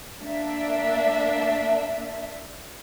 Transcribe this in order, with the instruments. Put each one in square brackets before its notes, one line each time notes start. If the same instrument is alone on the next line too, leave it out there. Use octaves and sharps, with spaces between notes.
[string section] A#3 D4 E5